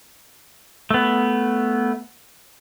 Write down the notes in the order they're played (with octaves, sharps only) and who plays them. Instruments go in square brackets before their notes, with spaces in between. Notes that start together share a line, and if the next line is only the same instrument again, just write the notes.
[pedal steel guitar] A3 B3